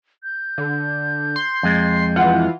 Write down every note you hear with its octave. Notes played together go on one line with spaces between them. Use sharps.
G6
D3
C6
F2 G#3
E3 F4 F#5